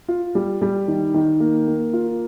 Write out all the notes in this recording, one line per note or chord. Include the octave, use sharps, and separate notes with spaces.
F4
G3
G3
D#3
D#3
A#3
A#3
F4